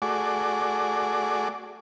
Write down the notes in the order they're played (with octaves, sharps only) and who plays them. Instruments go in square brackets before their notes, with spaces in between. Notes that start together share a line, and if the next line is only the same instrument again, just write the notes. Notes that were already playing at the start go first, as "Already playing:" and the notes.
[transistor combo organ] A3 F#4 G#4 D5 D6